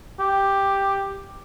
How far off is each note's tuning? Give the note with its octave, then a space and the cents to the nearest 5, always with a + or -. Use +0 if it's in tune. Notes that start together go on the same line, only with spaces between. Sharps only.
G4 +5